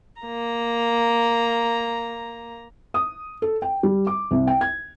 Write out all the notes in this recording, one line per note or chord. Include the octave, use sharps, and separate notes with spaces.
A#3 A#5
D#6
A4
G5
G3
D6
C2
G5
G#6